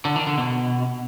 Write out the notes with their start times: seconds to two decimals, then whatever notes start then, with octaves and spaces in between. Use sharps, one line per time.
0.05 D3
0.16 D#3
0.27 D3
0.38 B2